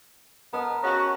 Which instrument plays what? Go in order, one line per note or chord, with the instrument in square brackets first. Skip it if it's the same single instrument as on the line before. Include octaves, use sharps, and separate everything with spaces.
[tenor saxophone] B3 [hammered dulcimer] A#4 D#5 A5
[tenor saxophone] C#4 [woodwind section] F#4